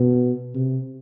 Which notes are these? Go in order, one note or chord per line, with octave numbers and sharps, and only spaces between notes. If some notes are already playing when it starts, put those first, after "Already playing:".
Already playing: B2
C3